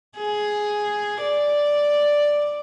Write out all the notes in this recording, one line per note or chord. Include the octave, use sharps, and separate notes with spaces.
G#4
D5